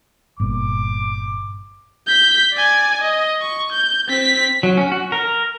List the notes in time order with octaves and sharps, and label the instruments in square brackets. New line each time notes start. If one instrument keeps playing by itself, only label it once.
[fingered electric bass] G1 A#2 [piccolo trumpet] D6
[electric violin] G6 B6
D5 G#5
D#5
C#6
G6
C4 B6
[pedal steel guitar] F#3
C#4
F#4
A#4